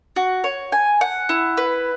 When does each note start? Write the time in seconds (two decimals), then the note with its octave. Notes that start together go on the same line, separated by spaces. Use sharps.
0.16 F#4
0.44 C#5
0.72 G#5
1.01 F#5
1.29 E4
1.57 B4